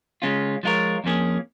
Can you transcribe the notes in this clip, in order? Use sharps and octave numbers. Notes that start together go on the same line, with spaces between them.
C#3 G#3 C#4 F4
F3 G#3 F4 A#4 C#5
F2 F3 A#3 C#4 G#4